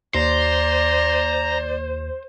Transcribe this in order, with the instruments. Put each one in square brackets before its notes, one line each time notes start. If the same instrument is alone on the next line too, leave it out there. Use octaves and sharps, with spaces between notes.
[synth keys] D#2 [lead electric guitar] C5 [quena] D5 [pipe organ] A#5